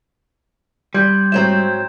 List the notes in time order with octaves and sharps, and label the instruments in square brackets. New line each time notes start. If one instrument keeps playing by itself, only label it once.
[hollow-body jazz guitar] G3 [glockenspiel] C6 G6 G#6
[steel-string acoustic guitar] G#2 F#3 C4 [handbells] C#5 E5 [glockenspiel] A#5 E7